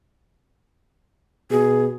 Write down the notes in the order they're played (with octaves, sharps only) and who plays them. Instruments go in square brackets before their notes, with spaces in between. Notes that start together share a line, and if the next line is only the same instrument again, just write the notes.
[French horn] B2 [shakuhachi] G#4